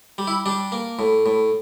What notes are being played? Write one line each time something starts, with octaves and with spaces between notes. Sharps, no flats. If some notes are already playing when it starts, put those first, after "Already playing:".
G3
E4
G3 D4
A#3
A2
A2